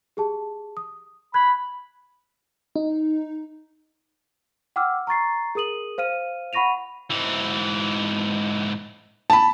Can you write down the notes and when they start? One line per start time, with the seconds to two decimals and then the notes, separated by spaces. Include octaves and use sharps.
0.17 G4 G#4 A5
0.77 D#6
1.34 B5 F#6 G#6
2.76 D#4
4.76 F#5 G5 D6 E6 F6
5.07 A#5 C#6 A6 C7
5.55 G#4 A#4 D#6 D#7 F#7
5.98 C5 F5 F6 D#7
6.53 F#5 B5 C#6 A#6 D#7 F7
7.10 G#2 E3
9.30 A5 B5